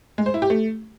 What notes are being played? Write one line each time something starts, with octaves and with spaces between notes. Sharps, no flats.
G#3
C5
E4
G4
A3